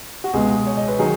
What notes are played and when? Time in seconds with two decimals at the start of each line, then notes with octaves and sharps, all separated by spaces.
0.24 F#4
0.34 C#2 B2 G#3 G#4
0.67 C#5
0.77 D#5
0.88 B4
0.99 D#3 F#3 G#4